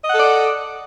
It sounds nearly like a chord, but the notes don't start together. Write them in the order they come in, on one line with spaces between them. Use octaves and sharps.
D#5 F#5 A4 D5